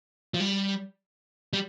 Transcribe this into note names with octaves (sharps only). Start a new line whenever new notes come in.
F3
G3
G3